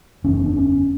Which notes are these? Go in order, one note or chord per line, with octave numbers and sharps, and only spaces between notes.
F#1 E2 C#3 C#4
C#4
D4
C#4